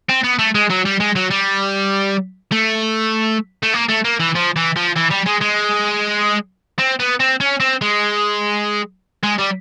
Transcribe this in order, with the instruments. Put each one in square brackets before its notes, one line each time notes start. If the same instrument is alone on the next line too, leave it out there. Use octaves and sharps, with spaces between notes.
[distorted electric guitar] C4
B3
A3
G#3
F#3
G3
G#3
F#3
G3
A3
A3
A#3
A3
A#3
E3
F3
E3
F3
E3
G3
G#3
G#3
C4
B3
C4
C#4
C4
G#3
G#3
G3